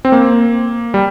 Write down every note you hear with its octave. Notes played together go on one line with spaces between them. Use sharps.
C4
A#3
G3